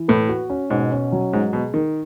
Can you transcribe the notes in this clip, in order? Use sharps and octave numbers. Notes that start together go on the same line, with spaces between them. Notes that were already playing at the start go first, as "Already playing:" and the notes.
Already playing: E3
A2 B4
F#4
C#4
G#2 B2
C#4
F#3
G#2 G#3
B2 G#4
D#3 D#4